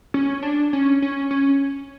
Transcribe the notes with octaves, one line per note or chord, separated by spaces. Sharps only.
C#4
D4
C#4
C#4
C#4